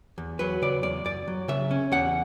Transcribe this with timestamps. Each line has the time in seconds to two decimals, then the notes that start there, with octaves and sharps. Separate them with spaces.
0.18 E2
0.39 F#3 B4
0.62 C#3 D5
0.83 E2 D5
1.05 F#2 D5
1.28 F#3
1.48 C#3 E5
1.71 C#4
1.92 E2 F#5